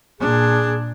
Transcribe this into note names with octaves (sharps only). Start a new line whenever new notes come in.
A#2 D4 G#4